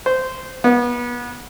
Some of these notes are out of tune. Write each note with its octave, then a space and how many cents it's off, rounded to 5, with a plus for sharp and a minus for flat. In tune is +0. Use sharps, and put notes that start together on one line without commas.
C5 -15
B3 -30